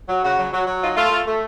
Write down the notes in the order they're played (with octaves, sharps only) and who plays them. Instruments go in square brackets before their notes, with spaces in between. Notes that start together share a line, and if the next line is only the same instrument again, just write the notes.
[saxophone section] F#3
C#3 F#4
F#3
F#3
F#3
D#4 F4
A3 F4
A3
A3